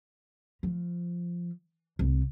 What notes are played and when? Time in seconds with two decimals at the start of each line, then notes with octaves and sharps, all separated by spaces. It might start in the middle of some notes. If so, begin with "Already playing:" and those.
0.63 F3
1.99 C2